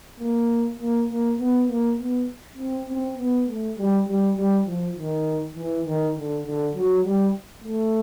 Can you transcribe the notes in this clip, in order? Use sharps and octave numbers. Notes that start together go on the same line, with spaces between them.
A#3
A#3
A#3
B3
A#3
B3
C4
C4
B3
A3
G3
G3
G3
F3
D#3
E3
D#3
D3
D3
F#3
G3
A3